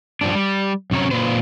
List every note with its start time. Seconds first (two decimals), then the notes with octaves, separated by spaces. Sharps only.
0.21 F3 G3 D4
0.35 G3
0.91 F#2 C3 C#4 C#5 A#5
1.11 A#2 B4 C5